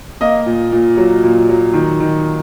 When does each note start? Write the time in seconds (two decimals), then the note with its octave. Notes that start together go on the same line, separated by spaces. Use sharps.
0.21 A#3 D#5
0.46 A#2
0.72 A#2
0.97 F#3
1.24 A#2
1.49 F#3
1.74 D#3
2.00 D#3